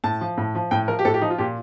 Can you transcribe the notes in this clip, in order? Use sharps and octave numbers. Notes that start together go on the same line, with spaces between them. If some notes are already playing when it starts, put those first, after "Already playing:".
A2 A5
F3
A2
F3
A2 G5
F3 A#4
G4
A2 A4
G4
F3 D#4
F4
A#2 G4